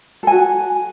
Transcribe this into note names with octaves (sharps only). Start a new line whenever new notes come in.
F#4 A4 G#5